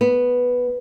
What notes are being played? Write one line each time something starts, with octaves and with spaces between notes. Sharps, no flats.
B3